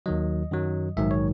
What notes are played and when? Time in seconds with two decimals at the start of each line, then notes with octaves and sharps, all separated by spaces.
0.06 D#2 D#3 F#3 D#5
0.51 F#2 D#3 F#3
0.97 A#1 G#2 D#3 F#3 E5
1.11 C#5